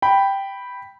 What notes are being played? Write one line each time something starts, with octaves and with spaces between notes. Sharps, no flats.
G5 B5